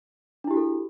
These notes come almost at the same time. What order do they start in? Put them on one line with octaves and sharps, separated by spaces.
D4 E4 G4 F#4 A4